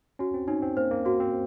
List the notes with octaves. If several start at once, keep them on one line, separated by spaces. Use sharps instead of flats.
C#4 F#4
C4
C#4 D#4
C4
A#3 C5
A#3
A#3 F#4
C4